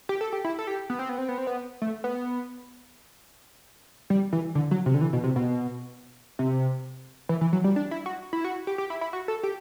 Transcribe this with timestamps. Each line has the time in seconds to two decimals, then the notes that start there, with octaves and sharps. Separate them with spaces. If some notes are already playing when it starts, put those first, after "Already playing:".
0.09 G4
0.21 A4
0.33 G4
0.44 E4
0.59 A4
0.67 G4
0.90 B3
0.99 C4
1.09 B3
1.18 C4
1.29 B3
1.38 C4
1.47 B3
1.82 A3
2.04 B3
4.10 G3
4.33 E3
4.55 D3
4.71 F#3
4.86 C3
4.94 D3
5.01 E3
5.13 B2
5.24 C3
5.36 B2
6.39 C3
7.29 E3
7.41 E3
7.53 F#3
7.64 G3
7.76 D4
7.91 E4
8.06 F#4
8.33 E4
8.45 F#4
8.67 G4
8.78 G4
8.90 E4
9.01 E4
9.13 F#4
9.28 A4
9.43 G4